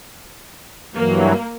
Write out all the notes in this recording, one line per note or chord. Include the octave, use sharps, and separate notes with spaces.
G2 E3 F#3 A#3